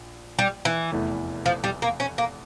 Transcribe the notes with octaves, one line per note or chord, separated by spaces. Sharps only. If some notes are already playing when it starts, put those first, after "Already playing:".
Already playing: A#1
G3
E3
F1 E2 E3 A3
F3
G3
A#3
C#4
A#3